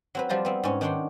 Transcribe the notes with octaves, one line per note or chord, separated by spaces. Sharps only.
F#3 C4 B4
F3 G3 F4 C5 A#5
B3 C4 E4
G#2 C#4
D#3 C#4 D4 F#5 G5 C6